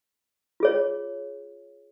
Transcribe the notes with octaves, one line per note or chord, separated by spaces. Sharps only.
F4 G#4 C#5